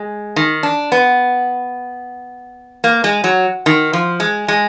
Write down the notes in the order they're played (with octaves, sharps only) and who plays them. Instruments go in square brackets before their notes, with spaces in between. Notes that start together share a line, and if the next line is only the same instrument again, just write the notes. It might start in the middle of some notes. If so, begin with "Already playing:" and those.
Already playing: [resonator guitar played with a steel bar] G#3
D#3
D4
B3
A#3
G#3
F#3
D#3
F3
G#3
G#3